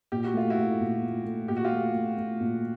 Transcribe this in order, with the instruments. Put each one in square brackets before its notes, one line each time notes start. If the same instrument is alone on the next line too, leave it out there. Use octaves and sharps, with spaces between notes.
[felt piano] A#2 [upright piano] G4
[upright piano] F#4
[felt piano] A3 [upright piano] F4
[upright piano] E4 F#4
[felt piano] A3
A#2
A3
A3
[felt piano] A#2 [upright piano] G4
[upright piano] F#4
F4 G4
[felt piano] A3
A3
A3
A#2